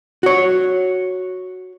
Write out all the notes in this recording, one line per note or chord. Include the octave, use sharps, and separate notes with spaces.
F#4 C#5